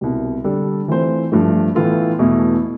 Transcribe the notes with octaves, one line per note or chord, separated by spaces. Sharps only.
C2 B2 G3
D3 G3 D4 A4
E3 A3 C4 F4 C5
G2 F3 A3
A2 E3 B3 F4 A4
E2 B2 A3 E4